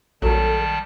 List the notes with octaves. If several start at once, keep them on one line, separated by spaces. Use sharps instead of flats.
A#1 D#3 F#3 G3 A4 A5